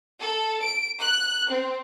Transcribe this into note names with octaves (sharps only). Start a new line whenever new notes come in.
A4
D7
F#6
C4